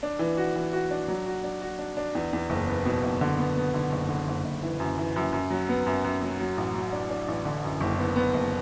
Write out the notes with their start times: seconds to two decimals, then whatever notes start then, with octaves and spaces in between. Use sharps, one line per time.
0.03 D4
0.19 E3
0.37 F#4
0.56 E3
0.73 F#4
0.91 D4
1.08 F#3
1.26 F#4
1.44 D4
1.62 F#4
1.79 D4
1.97 D4
2.15 E2
2.33 E2
2.50 F#1
2.68 B3
2.85 B2
3.03 F#1
3.21 D3
3.39 B3
3.56 B3
3.74 D3
3.92 F#1
4.09 D3
4.28 F#1
4.44 F#1
4.63 E3
4.80 F#2
4.98 E3
5.16 F#2
5.33 F#2
5.50 F#3
5.69 B3
5.86 F#2
6.04 F#2
6.22 F#3
6.40 F#3
6.57 A1
6.74 F#3
6.92 D4
7.10 D4
7.28 A1
7.45 D3
7.64 F#2
7.80 F#1
7.99 B3
8.16 B3
8.34 F#1